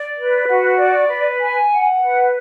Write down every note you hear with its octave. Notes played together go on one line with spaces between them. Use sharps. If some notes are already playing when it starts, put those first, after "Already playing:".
Already playing: D5
B4
F#4
D5
B4
G#5
F#5
B4